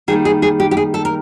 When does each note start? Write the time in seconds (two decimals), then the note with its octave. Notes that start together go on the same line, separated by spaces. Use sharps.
0.08 D#3 G3 A#3 G#4
0.25 G#4
0.42 G#4
0.60 G4
0.71 G4
0.77 G#4
0.94 A4
1.05 A#4